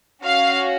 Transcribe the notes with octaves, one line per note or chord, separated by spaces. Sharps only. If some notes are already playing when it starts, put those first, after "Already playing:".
C#4 F#4 F5